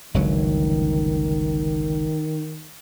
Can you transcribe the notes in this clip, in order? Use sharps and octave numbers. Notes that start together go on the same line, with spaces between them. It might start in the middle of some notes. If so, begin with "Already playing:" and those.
G1 C#2 D#3 F#3